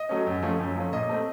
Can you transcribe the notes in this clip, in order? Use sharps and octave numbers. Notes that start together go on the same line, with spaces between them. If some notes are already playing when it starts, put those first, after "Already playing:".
Already playing: D#5
F#3 A3 C#4
F#2
F3 A3 C#4
F#2
F3 A3 C#4
A#2 D#5
A3 C4